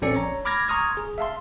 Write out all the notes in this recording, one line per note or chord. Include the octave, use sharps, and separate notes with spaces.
A#1 C4 C#4 A4 D5 C#7
C#5 A#5
B5 D6 F6 G#6 A#6
A#5 C6 C#6 D#6 F6 G#6
G#4
E5 F5 A5 C6